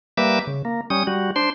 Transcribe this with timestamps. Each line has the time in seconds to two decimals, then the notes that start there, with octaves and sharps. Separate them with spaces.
0.18 G3 A#3 B4 E5 D6
0.47 C#3
0.65 A#3
0.90 G3 C#4 D#6
1.07 G3 F#4
1.36 D4 C5 C6